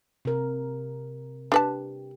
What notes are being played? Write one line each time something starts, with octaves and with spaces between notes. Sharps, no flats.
C3 A#4
D4 G4 B4 A5